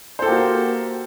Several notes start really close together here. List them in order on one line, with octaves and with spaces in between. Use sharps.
C5 A4 G4 A#3 F#4